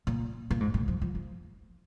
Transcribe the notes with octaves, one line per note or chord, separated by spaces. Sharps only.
A#2
A#2
G#2
A#2
F3
F3
F3